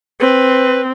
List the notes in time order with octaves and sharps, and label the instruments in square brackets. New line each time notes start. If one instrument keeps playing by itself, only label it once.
[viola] C4 [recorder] B4